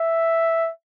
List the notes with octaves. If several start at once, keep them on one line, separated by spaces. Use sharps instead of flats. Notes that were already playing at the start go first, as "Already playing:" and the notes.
Already playing: E5